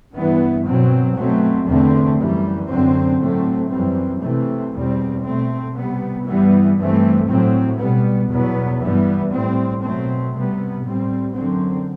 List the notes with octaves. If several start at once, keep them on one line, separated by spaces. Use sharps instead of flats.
G2 E3 B3
B2 F#3 C4
B2 F#3 A3 C4
E2 D3 A3 C4
F#2 E3 G3
F#2 D3 F#3 C4
A2 F#3 A3 C4
F#2 E3 G3 C4
C3 E3 A3 C4
E2 B2 G3 C4
B2 A3 C4
C3 G3 B3
G2 E3 G3 B3
G2 E3 A3 C4
A2 F#3 C4
B2 G3 B3
E2 B2 F#3 B3
G2 E3 G3 B3
A2 G3 C4
B2 F#3 A3 C4
C3 G3 B3
A2 G3 C4
F#2 D3 F#3 C4